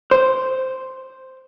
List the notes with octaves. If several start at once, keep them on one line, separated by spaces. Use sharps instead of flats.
C5